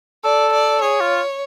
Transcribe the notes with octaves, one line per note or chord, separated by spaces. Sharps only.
A4 D5
D5
G#4 C#5
F4